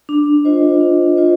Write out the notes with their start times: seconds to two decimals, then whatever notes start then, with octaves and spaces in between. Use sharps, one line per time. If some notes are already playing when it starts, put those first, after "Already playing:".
0.09 D4
0.45 F4 C5 D#5
0.81 D4
1.16 F4 C5 D#5